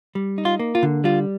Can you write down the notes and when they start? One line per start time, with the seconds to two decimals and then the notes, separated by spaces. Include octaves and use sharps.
0.15 G3
0.38 D#4
0.45 F4
0.59 A#3
0.75 F4
0.83 D3
1.04 G3 F4